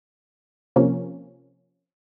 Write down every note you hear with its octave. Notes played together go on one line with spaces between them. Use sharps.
C3 F3 A#3 C#4